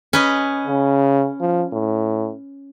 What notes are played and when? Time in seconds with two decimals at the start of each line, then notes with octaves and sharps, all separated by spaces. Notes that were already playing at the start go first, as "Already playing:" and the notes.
0.13 C#4 B4 D#5
0.67 C#3
1.40 F3
1.73 A2